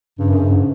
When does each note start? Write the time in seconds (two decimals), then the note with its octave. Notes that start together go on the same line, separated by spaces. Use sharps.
0.19 G2 C#3
0.29 F#2
0.39 G2
0.48 G#2